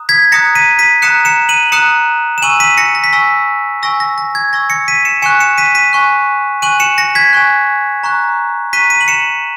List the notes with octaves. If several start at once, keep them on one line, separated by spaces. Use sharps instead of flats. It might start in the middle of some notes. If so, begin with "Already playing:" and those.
Already playing: A#5 D#6 F#6
G#6 B6
A#5 D#6 F#6 A#6 C#7
B6 D#7
B6 D#7
A#5 D#6 F#6 C#7 E7
C#7 E7
D#7 F#7
A#5 D#6 F#6 C#7 E7
E7
G#5 C#6 E6 D#7 F#7
B6 D#7
A#6 C#7
A#6
B6
G#5 C#6 E6 A#6
G#5 C#6 E6 A#6
A#6
A#6
G#6
G#5 C#6 E6 A#6
A#6 C#7
B6 D#7
C#7 E7
G#5 C#6 F#6 C#7 E7
C#7 E7
B6 D#7
B6 D#7
G#5 C#6 F#6
G#5 C#6 F#6 D#7 F#7
C#7 E7
A#6 C#7
G#6 B6
G#5 C#6 F#6
A#5 C#6 F#6
A#5 C#6 F#6 B6 D#7
B6 D#7
F#7
C#7 E7